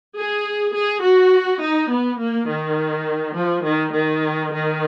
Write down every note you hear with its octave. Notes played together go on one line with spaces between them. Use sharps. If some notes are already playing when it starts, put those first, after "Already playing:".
G#4
G#4
F#4
D#4
B3
A#3
D#3
F3
D#3
D#3
D#3